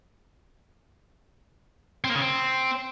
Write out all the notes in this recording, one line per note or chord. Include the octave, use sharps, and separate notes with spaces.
C4
A#3
C#3
C4